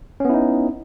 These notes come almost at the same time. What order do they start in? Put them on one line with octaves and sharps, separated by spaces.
C#4 B3 E4 D#4